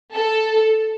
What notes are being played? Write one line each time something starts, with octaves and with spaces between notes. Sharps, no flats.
A4